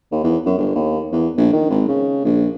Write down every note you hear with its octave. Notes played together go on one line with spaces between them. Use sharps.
D#2
E2
F#2
G1
D#2
E2
A#1
D#3
G#1
C#3
A#1